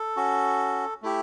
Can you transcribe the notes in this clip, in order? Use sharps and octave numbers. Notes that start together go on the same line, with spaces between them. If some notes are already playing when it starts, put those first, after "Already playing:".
Already playing: A4
C#4 F#4
A3 E4 G4